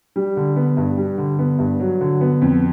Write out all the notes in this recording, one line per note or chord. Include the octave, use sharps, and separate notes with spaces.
G3
D3
B3
G2
G3
D3
B3
G2
F#3
D3
B3
F2